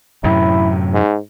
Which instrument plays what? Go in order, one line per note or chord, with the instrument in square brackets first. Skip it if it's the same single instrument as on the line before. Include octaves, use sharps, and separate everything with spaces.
[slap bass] F#2 A2 C3 [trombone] E4
[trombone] G#2